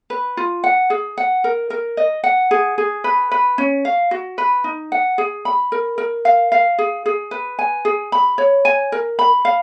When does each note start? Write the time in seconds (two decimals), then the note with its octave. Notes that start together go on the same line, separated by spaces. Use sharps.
0.10 B4
0.37 F4
0.64 F#5
0.90 G#4
1.18 F#5
1.44 A#4
1.70 A#4
1.97 D#5
2.24 F#5
2.51 G#4
2.78 G#4
3.04 B4
3.31 B4
3.58 C#4
3.85 F5
4.11 F#4
4.38 B4
4.64 D#4
4.92 F#5
5.18 G#4
5.45 B5
5.72 A#4
5.98 A#4
6.25 F5
6.52 F5
6.78 G#4
7.06 G#4
7.31 B4
7.59 G#5
7.85 G#4
8.12 B5
8.38 C#5
8.65 G#5
8.92 A#4
9.19 B5
9.45 F5